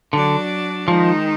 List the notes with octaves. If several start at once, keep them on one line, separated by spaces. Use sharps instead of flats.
D3 F#3 D4 F#4 D5
D#3 F3 G#3 D#4